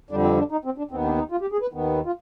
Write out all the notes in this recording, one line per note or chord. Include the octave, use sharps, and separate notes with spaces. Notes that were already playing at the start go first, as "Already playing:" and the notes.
F2 D3 G3 D4
C4
D4
D#4
C4
D4
D#2 D#3 B3 C4
D4
D#4
F4
G4
G#4
B4
D#2 D#3 B3
F4